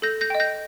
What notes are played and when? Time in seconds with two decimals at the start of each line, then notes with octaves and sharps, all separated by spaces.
0.02 A4 G6 A#6
0.21 G6 A#6
0.30 D#5 G5
0.40 G6 A#6